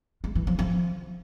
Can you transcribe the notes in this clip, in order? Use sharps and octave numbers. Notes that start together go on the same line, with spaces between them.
G#3
E3
F3
F3